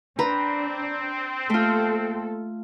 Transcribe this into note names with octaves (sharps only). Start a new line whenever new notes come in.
C4 D4 B4 A#5
A3 A#3 F4 A4